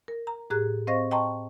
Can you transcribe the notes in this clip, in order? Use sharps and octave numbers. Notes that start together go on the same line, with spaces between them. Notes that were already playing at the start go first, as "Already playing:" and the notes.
A#4
A#5
A2 G4 G#4 A#5 F#6
C4 C5 D#5 F5 C#6 A#6
D#5 G5 A5 A#5 C6 C#6